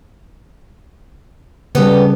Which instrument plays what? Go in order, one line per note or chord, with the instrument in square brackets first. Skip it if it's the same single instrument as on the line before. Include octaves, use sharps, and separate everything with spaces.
[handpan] C#3 G3 [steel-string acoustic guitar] B3 G4 A4